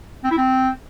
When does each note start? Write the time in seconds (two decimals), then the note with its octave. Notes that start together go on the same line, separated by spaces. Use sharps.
0.24 C4
0.31 E4
0.38 C4